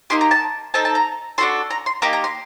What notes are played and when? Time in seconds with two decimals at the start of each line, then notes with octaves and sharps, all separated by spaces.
0.10 A#3 D#4 G4 C6
0.21 A#5
0.31 A5
0.74 C4 D#4 A4 A5
0.85 A5
0.95 A#5
1.38 D4 F#4 A4 C6
1.71 A#5
1.86 C6
2.02 A#3 D#4 G4 A#5
2.13 A#5
2.24 C6